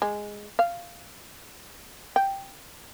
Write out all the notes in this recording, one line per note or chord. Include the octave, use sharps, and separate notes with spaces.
G#3
F5
G5